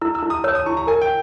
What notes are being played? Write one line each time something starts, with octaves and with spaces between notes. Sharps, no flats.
E4 E6
E6
E4
D#6
C#5 E6
D#6
E4 C#6
A#5
A#4 G#5
G5